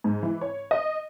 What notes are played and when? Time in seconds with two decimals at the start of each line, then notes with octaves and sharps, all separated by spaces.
0.04 G#2
0.23 E3
0.41 C#5
0.71 D#5